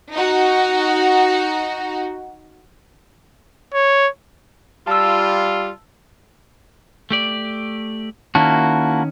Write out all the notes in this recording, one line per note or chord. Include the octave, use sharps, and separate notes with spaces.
D#4 F#4
C#5
G3 F4 A5 E6
A3 G4 D5
D#3 A#3 C#4 E4 F#4 A5